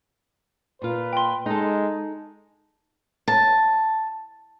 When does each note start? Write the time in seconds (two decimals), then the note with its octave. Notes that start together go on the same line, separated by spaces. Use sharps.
0.82 A#2 F4 B4
1.13 G5 C6
1.46 G#3 D#4 A4
3.28 A5